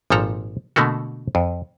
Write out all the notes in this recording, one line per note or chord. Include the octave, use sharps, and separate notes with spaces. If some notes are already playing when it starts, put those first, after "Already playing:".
G#1 A#2 F3 A4 A#5
B2 D3 A3 A#3 F#4
F2